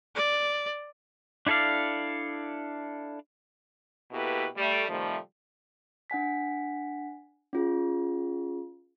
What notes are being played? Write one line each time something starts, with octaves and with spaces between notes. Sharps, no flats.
D5
D4 E4 A4 D5 F5
B2 A#3 E4 G4 A4 B4
G3 A3
C3 D#3 F3 G3 A3
D4 F#5 G#5 B6
C#4 F4 G#4